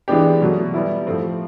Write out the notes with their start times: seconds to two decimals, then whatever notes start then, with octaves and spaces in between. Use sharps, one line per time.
0.08 E3 G#3 B3 D4 G4
0.41 B2 F#3 A3
0.74 G3 B3 E4
1.07 A2 F3 A3 C4